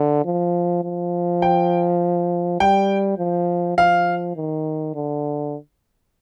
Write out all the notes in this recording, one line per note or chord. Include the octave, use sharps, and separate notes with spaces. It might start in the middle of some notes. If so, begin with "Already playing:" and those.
Already playing: D3
F3
F3
G5
G3 G5
F3
F3 F5
D#3
D3